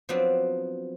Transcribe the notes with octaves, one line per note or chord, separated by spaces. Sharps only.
F3 F#3 B3 C4 D4